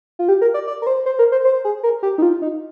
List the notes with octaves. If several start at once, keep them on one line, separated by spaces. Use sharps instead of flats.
F4
G4
A#4
D5
D5
A#4
C5
C5
A#4
C5
C5
G#4
A#4
G4
D#4
F4
D#4